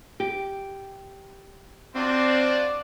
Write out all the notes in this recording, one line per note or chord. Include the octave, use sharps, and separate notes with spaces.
G4
C4 D4 F4 F#4 C5 D5